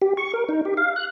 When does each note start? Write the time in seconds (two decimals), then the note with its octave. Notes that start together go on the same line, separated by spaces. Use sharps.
0.02 G4
0.17 C#6
0.34 A#4
0.49 D#4
0.65 G4
0.77 F5
0.96 F#6